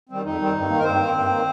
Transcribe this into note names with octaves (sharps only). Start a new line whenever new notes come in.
D#3 G3 C4
F2 D#4
D#3 G3 C4
G2
D#3 A#3
A#4
G2 C4 C5
D#3 A#3
G2
D#3 A#3